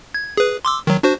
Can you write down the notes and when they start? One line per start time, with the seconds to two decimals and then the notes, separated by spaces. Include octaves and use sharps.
0.14 G#6
0.37 G#4 B4
0.65 C6 D6 E6
0.87 D#3 F#3
1.03 D4 F#4 C5